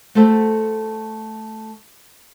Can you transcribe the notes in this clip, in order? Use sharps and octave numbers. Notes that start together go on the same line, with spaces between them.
A3 F#4 A4 C5 E5